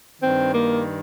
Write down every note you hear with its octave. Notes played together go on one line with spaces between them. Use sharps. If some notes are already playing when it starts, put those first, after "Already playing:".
D#3 C4
G2
A#3